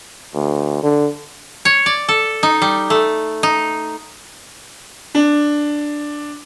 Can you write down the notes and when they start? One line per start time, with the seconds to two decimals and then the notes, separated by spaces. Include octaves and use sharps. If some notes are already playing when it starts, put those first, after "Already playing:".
0.34 D2
0.83 D3
1.65 C#5
1.86 D5
2.09 A4
2.43 D#4
2.62 G3
2.90 A3
3.43 D#4
5.15 D4